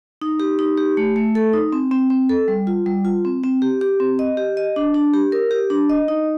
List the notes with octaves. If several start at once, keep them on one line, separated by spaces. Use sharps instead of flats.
D#4
G4
D#4
G4
A3
A3
A4
D#4
C4
C4
C4
A4
G3
F4
G3
F4
C4
C4
G4
G4
C4
D#5
G4
D#5
D4
D4
G4
A#4
G4
D4
D#5
D#4